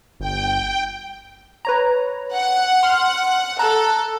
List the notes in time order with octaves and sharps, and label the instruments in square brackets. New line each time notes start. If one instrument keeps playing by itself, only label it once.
[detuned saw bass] G1 [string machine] G5
[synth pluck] B4 C#5 A#5
[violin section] F#5
[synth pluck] C6 F6
[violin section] A4 [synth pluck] A#5 F#6